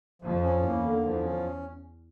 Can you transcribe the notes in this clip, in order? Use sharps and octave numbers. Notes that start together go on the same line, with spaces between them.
F2 F3
C#4
E2 A#3
D3
E2 F3
C#4